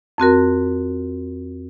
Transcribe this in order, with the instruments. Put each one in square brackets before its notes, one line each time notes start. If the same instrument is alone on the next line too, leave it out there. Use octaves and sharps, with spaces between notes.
[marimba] F2 C4 F#4 A#4